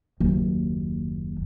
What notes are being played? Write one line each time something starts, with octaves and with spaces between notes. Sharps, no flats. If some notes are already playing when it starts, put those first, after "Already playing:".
F#1 D#2